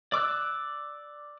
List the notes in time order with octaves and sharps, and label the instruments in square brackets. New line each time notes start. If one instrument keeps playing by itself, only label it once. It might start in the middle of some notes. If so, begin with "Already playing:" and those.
[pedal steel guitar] D5 D6 E6 F#6